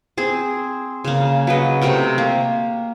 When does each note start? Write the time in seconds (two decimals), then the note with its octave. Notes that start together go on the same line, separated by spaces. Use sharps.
0.17 C4 G#4
1.04 C#3 A#3
1.47 F#3 B4 D#5
1.81 C3 A3 A#4 G5
2.18 A#3